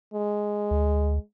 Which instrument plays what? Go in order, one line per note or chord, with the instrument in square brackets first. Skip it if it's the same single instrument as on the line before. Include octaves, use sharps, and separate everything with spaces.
[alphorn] G#3
[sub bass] D2